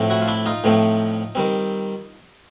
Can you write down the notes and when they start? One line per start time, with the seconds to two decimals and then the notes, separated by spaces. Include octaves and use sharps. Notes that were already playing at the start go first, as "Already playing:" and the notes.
Already playing: A2 F3 A3 C4
0.10 E4 F#4
0.21 F4
0.28 D4 E4
0.46 D#4 F4
0.64 A2 F3 A3 C4
1.35 D#3 G3 C4